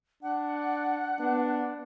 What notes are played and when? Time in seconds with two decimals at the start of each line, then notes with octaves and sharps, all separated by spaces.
0.23 D4 F#5
1.20 B3 D4